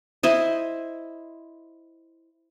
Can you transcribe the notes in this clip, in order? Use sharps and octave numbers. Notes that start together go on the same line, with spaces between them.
E4 C5 D#5